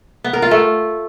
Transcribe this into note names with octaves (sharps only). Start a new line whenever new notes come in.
B3
A#4
F4
A3